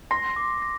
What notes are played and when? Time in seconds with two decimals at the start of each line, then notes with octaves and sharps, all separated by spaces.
0.11 C6 A#6
0.36 D6
0.62 A#6